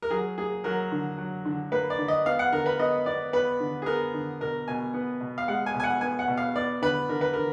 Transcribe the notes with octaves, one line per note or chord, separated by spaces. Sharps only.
A#4
F#3 G#4
A#3 G#4
F#3 A#4
D3
F#3
D3
A#3 B4
D5
D3
D#5
B3 F5
F#5
D3 A#4
B4
B3 D#5
B3 D5
B3 B4
D3
G#4
B3 A#4
D3
B2 A#4
B2 G#5
B3
B2
F5
G#3 F#5
G#5
B2
G#5
F#5
B3 G#5
F#5
B2
F5
B3 D5
D3 B4
D3 A#4
B4
D3 A#4